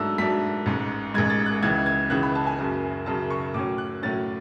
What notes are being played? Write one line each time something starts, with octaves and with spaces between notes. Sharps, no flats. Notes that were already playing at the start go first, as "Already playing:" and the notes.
Already playing: G#2 F#3 A3 D4 E6
G#2 F#3 A3 D4 B6
A1 G#2 G#3
A1 G#2 G#3 G#6
A6
F#6
C#2 C#3 E3 G#6
G#6
C#2 C#3 E3 F#6
B5
A5
G#5
F#1 F#2 C#3
F#1 F#2 C#3 A5
C#6
A2 F#3 C#4 D6
F#6
A2 F#3 C#4 A6